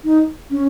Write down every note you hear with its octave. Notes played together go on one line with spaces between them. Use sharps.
D#4
C#4